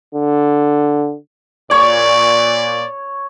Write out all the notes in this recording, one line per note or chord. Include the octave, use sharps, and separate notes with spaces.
D3
A#2 C#5 D5